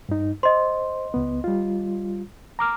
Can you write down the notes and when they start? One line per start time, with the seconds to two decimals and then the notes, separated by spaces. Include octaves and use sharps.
0.09 G2 D#4
0.43 C5 D#5 C6
1.14 C#2 B3
1.44 G3 F4
2.59 A#5 D6 F6